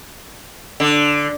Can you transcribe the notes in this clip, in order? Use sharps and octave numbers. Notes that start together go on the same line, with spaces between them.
D3